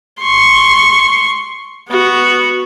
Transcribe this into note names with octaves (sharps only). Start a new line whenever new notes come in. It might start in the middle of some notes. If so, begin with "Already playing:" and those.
C6 C#6
B3 F#4